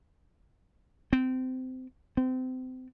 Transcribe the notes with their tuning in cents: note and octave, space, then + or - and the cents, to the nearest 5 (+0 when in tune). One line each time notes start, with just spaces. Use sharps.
C4 -25
C4 -30